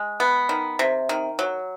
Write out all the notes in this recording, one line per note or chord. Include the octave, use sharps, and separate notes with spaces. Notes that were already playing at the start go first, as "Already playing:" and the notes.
Already playing: G#3
B3
D#3
C3
D#3
F#3